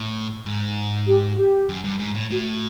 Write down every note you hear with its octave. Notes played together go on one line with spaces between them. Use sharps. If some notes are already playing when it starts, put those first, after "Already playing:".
Already playing: A2
G#2
G4
F#4
G4
F#2
G2
G#2
A2
A2 F#4